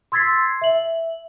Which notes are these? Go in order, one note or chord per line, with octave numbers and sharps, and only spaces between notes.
C6 E6 G#6 A6 B6 C7
E5 F#7